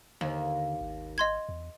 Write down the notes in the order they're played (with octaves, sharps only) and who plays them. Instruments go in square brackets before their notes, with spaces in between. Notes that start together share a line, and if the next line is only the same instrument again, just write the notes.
[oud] D#2 [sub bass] D3
[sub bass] G#1
[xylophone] D#5 C6 G#6
[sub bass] E2